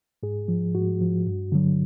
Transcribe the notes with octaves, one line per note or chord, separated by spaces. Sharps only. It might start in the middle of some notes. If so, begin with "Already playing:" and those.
G#2 G#4
F3
G#2 F#4
F3
G2
D3 F#3